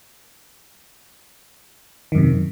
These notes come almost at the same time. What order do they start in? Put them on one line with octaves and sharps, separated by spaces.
D#3 F#2 C3